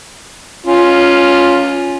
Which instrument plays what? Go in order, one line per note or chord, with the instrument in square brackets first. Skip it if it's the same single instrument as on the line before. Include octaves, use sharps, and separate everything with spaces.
[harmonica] C#4 F4